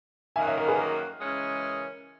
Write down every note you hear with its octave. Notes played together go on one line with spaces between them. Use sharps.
F#2 D#3 A#3 E5 G#5
C#5 E5
A#4
G#4 B4
A#4
C#3 E3 G#3 C#4